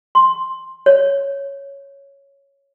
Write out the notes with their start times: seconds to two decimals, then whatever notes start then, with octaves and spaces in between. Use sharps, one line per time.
0.15 C6
0.86 C#5